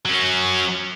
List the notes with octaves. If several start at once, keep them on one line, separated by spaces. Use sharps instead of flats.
F#3 C#4